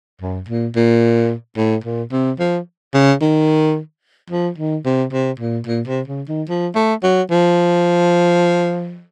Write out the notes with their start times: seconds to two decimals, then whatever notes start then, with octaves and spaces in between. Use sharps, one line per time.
0.22 F#2
0.49 A#2
0.76 A#2
1.57 A2
1.84 A#2
2.12 C3
2.39 F3
2.94 C#3
3.22 D#3
4.30 F3
4.58 D#3
4.85 C3
5.13 C3
5.40 A#2
5.67 A#2
5.87 C3
6.08 C#3
6.29 D#3
6.49 F3
6.75 A3
7.03 F#3
7.31 F3